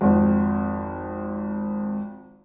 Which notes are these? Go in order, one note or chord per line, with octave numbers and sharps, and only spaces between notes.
G#1 F2